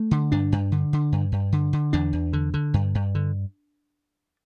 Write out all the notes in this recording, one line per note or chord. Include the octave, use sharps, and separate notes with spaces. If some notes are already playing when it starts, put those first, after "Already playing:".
Already playing: A3
D3
G2 D4
G2
D3
D3
G2
G2
D3
D3
E2 D4
E2
D3
D3
G2
G2
D3